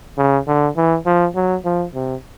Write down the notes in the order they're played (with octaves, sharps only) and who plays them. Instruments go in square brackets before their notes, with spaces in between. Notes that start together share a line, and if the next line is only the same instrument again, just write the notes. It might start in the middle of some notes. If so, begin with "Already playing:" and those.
[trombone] C#3
D3
E3
F3
F#3
F3
C3